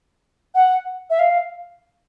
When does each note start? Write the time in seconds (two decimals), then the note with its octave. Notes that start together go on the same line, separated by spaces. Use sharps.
0.55 F#5
1.10 E5
1.19 F5